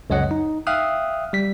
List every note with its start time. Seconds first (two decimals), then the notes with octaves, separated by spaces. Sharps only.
0.10 C#2 F#2 C#5 D#5 F#5
0.31 D#4
0.67 E5 F5 G5 D#6 F6 F#6
1.33 G3 B6